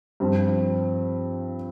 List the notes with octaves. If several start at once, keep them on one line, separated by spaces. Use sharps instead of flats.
G2 F3 C4